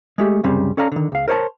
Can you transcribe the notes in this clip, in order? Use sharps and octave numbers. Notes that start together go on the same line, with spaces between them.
G#3 A3 G4
C2 F#2 C#3 G3 C4
C#4 A4 D5 F5 A#5
D3 D#3
C#2 F5
A#4 C5 C#5 D#5 A5